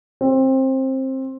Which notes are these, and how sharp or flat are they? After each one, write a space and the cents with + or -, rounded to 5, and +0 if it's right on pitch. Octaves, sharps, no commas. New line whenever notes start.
C4 +20